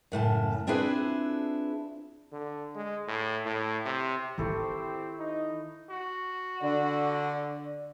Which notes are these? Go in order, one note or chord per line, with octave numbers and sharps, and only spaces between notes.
F#2 A2 C#3 A5
C4 D4 E4 F4 G#4 B4
D3
G#3
A2
A2
C3
D#3 C4 E4 F4 G4 A4 C5 C#6
D#4
F#4
D3 D5